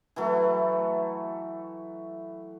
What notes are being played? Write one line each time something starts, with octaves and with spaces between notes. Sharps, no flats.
E3 F#3 A3